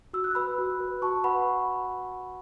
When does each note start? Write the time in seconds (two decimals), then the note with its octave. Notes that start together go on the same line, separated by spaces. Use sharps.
0.13 F#4 E6
0.24 F#6
0.35 B4 B5 E6
0.58 F#4
0.80 B4
1.02 F#4 A5 C#6
1.24 B4 F#5 B5